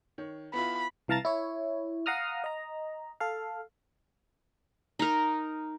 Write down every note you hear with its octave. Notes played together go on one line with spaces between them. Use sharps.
D#3 C#5
B3 E4 F4 B5
C2 E3 F5 A5 A#5 A6
E4 C#5
F5 F#5 A#5 D#6 F6
D#5 A#5
A4 F5
D#4 A#4